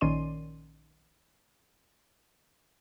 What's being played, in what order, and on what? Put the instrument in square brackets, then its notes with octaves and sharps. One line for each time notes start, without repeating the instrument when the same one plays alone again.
[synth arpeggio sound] A#1 D#3 C#4 D5 C6 D#7